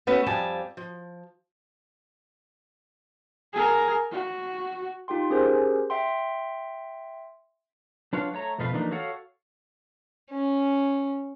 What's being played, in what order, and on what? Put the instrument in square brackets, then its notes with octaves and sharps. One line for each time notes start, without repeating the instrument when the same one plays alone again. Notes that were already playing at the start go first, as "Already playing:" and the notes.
[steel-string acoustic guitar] A3 B3 C#4 F#4 A4 B4
F2 F3 G3 G#5 A5
F3
[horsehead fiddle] G#4 A#4
F#4
[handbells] D#4 F4 G4 G5 C6
C#4 G4 G#4 A#4 C5
E5 G5 C6
[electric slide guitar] F#3 D4 F4 B4 C#5 F5
A3 C#5 A#5
F2 B2 A3 B3 F4 B4
E3 F3 A3 A#3 D4 D#4
F#4 A4 C#5 F5 F#5
[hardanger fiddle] C#4